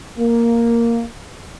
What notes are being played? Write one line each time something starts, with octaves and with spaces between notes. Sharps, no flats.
A#3